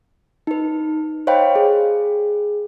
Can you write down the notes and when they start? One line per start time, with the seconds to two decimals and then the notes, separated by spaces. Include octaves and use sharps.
0.47 D#4 B4
1.27 C5 C#5 D#5 F5 G5 B5
1.56 G#4